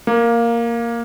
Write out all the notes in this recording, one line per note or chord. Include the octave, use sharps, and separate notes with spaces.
A#3